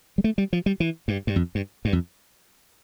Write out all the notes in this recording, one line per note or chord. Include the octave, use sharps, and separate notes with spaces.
G3
A3
G3
F3
G3
E3
G2
G2
F2
G2
G2
F2